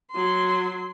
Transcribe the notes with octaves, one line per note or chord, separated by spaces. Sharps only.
F#3 C6